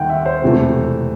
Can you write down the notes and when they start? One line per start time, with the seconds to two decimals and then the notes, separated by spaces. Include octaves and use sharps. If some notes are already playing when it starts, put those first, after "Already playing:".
Already playing: D#2 D#3 G3 F#5 G5
0.10 E5
0.26 C5
0.42 E1 E2 C3 E3 A3